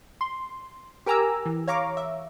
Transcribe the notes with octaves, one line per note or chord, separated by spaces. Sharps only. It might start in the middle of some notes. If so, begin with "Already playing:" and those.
C6
G4 A#4 G#5 A#5 D6 E6
E3
C#5 F5 A#5 C#6 D6
E5